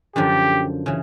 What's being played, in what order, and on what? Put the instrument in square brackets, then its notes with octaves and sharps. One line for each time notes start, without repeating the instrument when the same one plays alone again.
[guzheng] F#2 D3 F3 [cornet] G4
[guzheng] C#3 E3